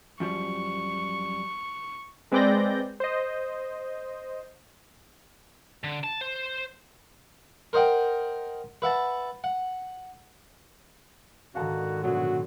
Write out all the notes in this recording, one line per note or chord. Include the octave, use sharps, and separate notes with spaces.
F#2 F3 G3 C#6
G#3 C4 B4 D5 G6 A#6
C5 D#5
D3
A5
C5
A#4 C5 D#5 F#5 G5
B4 E5 F#5 A5
F#5
G#2 D3 D#3 F#4 F5 A5 A#5
A#1 B2 F#3 F#4